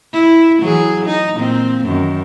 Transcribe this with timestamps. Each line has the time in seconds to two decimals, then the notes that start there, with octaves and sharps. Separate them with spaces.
0.13 E4
0.60 E3 F#3 G#4
1.06 D#4
1.35 A#2 C4
1.84 F#2 D#3